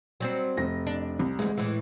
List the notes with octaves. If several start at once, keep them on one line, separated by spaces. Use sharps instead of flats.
F#3 G3 C4
F1 A#6
D4
C2
D2 E3 G#3
A2 E3